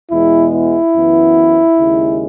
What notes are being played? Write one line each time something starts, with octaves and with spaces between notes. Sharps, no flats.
E2 B2 G#3 B3 E4
E4
F#2 E3 B3
D#2 C#3 G#3